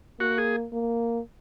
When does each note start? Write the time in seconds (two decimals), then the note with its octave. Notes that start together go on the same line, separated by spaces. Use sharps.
0.20 A#3 F#4
0.38 G#4
0.73 A#3